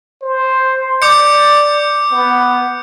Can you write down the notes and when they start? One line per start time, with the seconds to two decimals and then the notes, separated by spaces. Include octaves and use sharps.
0.22 C5
1.02 D5 D6 G6 C#7
2.11 B3